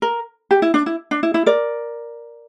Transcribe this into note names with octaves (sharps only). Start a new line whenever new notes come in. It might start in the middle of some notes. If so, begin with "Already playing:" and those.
A#4
G4
E4
D4
E4
D4
E4
E4
A#4 D5